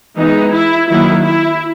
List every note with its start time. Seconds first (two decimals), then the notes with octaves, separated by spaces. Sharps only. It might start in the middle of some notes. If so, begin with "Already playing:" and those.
0.17 E3 G#3 B3 D#4
0.53 E4
0.89 D#3 F#3 A#3 E4
1.25 E4